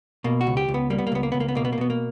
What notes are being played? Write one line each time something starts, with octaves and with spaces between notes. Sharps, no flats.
B2 A#3
F#4
C#2
G4
C#2
B3
G3 A#3
B3
A#3
C#2 B3
A#3
C#2 B3
A#3
B3
B2 A#3
B3
A#3
B2 B3
A#3